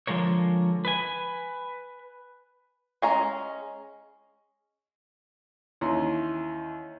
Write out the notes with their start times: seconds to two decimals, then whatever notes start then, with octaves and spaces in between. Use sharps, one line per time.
0.07 D3 F3 G#3 A#4 C#5
0.85 B4 G#5
3.02 G#3 C#4 A#5
5.81 D#2 E3 C#4 A#5 C6